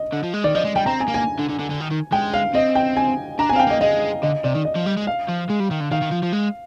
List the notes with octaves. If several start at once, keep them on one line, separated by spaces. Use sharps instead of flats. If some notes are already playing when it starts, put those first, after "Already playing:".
Already playing: D#5
D3
F3
G#3
D#3 D5
F3 D#5
G#3
G3 G5
C4 A#5
G#5
A#3
G#5
D3
D3
D3
D3
D#3
D#3
G#3 G5
F5
C4 D#5
G5
G#5
D4 A#5
G#5
C4 F5
G5
A#3 D#5
G#3 D#5
D3 D#5
C3 D5
D#3
D#5
F3
G3
G#3
F5
F3
G#3
G3
D#3
D3
D#3 F5
D#3
F3
F3
G#3